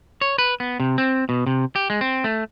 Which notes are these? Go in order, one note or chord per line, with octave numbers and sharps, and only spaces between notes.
C#5
B4
B3
C3
C4
B2
C3
G4
G#3
C4
A3